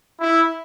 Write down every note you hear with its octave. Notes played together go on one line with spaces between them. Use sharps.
E4